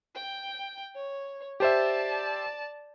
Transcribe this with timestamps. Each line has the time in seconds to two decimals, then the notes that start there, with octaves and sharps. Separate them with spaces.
0.15 G5
0.95 C#5
1.60 G4 C5 D5 E5 A5